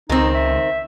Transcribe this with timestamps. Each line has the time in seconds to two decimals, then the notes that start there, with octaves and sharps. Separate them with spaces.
0.10 C#2 D#3 C4 D#4
0.35 E5